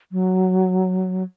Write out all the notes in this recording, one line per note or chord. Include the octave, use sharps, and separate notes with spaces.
F#3